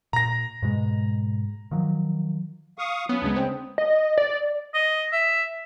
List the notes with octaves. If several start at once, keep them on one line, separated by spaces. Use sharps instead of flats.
A#2 A#5 A#6
G#2 B2 G#3
D#3 F3 F#3
F5 C#6 D#6
F#3 B3 C#4 D#6
D2 C#3 G#3 D4
C4 C5 G5
D#5
D5
D#5
E5